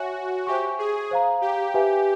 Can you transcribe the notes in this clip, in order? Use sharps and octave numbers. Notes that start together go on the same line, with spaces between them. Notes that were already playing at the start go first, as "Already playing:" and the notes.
Already playing: F#4 C#5 E5 G#5
G4 C5 E5 G#5 C#6
G#4
C5 F5 A#5
G4
G4 B4 E5 G#5